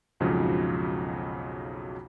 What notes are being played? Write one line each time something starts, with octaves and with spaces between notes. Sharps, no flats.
B1 F2 G#2 C#3 F3 F#3